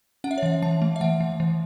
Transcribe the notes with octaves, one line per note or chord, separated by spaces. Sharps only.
C#4 F#5
E5
C#5
E3 E5
E3 A5
A3
E5
E3 F#5
E3
E3